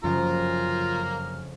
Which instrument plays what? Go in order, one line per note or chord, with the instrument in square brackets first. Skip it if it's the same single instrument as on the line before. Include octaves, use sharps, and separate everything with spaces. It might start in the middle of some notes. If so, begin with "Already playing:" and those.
[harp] F1 C#3 F3 [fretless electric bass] F#2 [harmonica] A#3 A#5 F6 [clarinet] F4